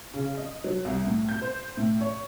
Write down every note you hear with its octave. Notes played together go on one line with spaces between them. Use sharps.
C#3
D#5
F#3
C2
A2
G6
C5
A2
C#5